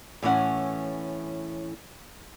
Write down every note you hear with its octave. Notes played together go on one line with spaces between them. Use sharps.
A2 E3 C#4 F#5